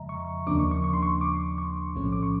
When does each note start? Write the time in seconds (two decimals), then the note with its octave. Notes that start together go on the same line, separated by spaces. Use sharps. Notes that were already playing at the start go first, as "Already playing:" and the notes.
Already playing: F2 C#3 F3 G#3 D#5 E5 A#5
0.09 C#6
0.47 D#2 C#3 F3 A#3 D4 D6
0.59 C#6
0.71 C#6
0.84 C#6
0.93 C6
1.03 C#6
1.21 D6
1.58 C#6
1.95 B1 A2 F3 A3 C#4
2.12 D6
2.23 C#6